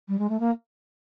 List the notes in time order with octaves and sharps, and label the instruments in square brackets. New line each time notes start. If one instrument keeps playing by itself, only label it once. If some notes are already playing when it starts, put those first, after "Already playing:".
[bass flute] G3
G#3
A3
A#3